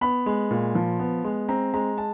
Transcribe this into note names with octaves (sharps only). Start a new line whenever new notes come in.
B3 B5
G#3
A#2
F3
B3
G#3
C4 A#5
G#3 A#5
A5